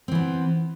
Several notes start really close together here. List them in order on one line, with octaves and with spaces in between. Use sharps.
C4 E3 B3